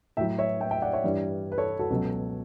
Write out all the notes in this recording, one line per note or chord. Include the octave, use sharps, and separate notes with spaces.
A2 F#3 E5 G5
C#5 E5
E5 G5
E5 G5
D5 F#5
C#5 E5
G2 E3 G3
B4
A4 C#5
F#4 A4
C#2 B2 F#3